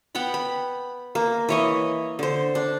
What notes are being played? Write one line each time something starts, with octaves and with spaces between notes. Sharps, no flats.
B3 F#5 G5 B5
B5
A#3
E3 C#5 D#5
D3 C5
D4